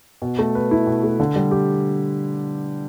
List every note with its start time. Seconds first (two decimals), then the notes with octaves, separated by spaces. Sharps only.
0.22 B2
0.39 A3
0.55 B4
0.71 E4
0.87 B2
1.04 A3
1.20 D3
1.36 G3
1.51 G4